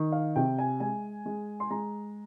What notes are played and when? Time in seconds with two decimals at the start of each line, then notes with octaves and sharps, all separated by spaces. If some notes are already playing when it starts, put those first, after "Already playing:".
Already playing: D#3
0.12 F5
0.36 C3 G5
0.58 G#5
0.80 G#3 G#5
1.26 G#3
1.60 C6
1.70 G#3 A#5